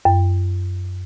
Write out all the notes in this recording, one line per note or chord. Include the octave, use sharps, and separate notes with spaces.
F#2